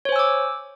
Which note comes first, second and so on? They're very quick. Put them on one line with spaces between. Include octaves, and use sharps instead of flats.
C#5 C5 G#5 E6 D6